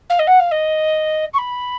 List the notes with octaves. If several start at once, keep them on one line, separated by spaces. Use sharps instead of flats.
F5
D#5
F#5
F5
D#5
C#6
B5